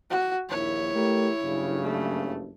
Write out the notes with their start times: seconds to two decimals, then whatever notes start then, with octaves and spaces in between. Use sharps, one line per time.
0.10 F#4
0.50 A#1 D#2 E4 C#5
0.94 A3 G4 A#4
1.43 F#1 G2 C#3
1.81 A3